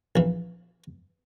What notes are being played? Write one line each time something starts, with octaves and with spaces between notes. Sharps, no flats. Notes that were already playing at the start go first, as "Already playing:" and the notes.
A#1 E3